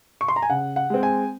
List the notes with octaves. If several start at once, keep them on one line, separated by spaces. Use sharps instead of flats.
C#6
C6
A#5
G#5
C#3 F#5
F#5
G#3 C4
G#5